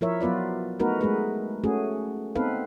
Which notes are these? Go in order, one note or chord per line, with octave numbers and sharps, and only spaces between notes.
F3 E4 A#4 C#5 E5
F#3 B3 F4 B4 D5
A3 B3 D#4 F#4 A#4 B4
G#3 A3 G#4 B4
A3 C#4 F#4 G#4
B3 C4 D#4 A4 B4 F5